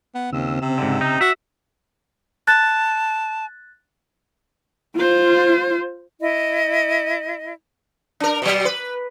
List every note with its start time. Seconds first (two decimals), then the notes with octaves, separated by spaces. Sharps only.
0.15 B3
0.33 D#2 C#3 C4 E6
0.61 C3
0.78 G#2 D3
1.01 D#4
1.21 F#4 E5
2.47 A5 F#6 A6
4.96 F4 C5
6.20 E4 D#5
8.20 D4 A#4
8.42 B2 F#3
8.65 B4